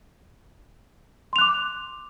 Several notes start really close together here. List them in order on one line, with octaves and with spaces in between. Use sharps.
C6 F7 F#6 D6